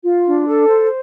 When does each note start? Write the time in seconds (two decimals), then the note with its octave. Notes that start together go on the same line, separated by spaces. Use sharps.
0.03 F4
0.26 D4
0.46 A4
0.68 C5